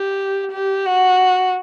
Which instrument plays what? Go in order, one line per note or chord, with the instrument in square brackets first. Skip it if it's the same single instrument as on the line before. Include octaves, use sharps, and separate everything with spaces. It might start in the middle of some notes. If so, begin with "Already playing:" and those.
Already playing: [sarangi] G4
G4
F#4